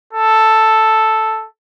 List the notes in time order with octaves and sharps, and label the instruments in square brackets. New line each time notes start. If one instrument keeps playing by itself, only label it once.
[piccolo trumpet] A4